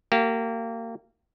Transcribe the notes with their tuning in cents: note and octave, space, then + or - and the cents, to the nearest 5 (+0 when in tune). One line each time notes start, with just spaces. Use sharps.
A#3 -30 G4 -35